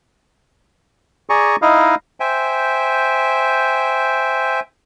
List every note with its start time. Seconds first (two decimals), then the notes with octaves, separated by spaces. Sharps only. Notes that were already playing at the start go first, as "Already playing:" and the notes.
1.30 G#4 D5 G#5 A#5 C#6
1.62 D#4 E4 D#5 F5
2.20 C5 E5 G5 G#5